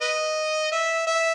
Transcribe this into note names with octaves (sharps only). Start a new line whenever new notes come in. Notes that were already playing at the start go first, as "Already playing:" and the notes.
B4 D#5
E5
E5